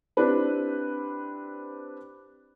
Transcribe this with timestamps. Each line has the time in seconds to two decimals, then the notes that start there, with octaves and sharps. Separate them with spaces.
0.17 C4 D4 E4 G4 B4